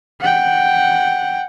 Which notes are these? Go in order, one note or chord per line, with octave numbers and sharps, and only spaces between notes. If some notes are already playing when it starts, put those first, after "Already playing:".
F#5 G5